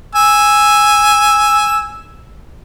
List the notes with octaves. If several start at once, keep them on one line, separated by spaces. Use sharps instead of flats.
G#5 E6